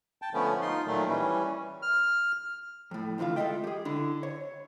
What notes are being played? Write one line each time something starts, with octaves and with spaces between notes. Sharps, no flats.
G5 A5
D3 F3 A3 B3 C#4
D#4 F4 C6
A#2 D#3 F#3 A3
E3 G3 C#4
F6
F2 A2
C#2 D3 E3 F4 F5
G#3 F4 A4 D#5 E5 G5
G4 G#4
D3 E4
C#5